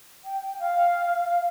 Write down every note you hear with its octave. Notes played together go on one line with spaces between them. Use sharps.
G5
F5